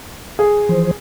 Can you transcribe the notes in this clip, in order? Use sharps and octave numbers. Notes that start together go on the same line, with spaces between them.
G#4
E3 F3 C5